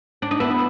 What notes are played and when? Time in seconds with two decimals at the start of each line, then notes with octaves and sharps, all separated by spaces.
0.22 D4
0.31 D#4
0.40 B3 E4